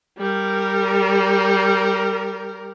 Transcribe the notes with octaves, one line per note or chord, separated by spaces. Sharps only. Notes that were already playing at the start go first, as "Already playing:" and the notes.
G3 A#4